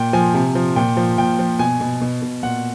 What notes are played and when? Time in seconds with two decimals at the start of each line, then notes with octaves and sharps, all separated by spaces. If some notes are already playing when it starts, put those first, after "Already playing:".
Already playing: A#2 G5
0.13 F3 G#5
0.34 C3
0.55 F3
0.76 A#2 G5
0.97 F3
1.18 A#2 G5
1.39 F3
1.59 B2 G#5
1.81 B2
2.01 B2
2.22 B2
2.43 A#2 F#5